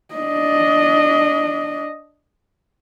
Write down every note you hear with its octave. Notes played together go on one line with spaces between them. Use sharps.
D4 D#5